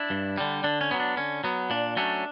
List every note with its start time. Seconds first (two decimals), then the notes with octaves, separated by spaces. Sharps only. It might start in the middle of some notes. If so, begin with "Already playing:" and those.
Already playing: D4 E4
0.10 G2
0.38 D3 G3
0.64 D3 D4
0.81 C#4
0.91 F#3 B3
1.00 D4
1.17 D3 C#4
1.44 F#3 B3
1.70 A#2 D4
1.97 F#3 A3 C#4 D4